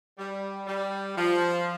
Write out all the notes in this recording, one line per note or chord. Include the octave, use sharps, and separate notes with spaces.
G3
G3
F3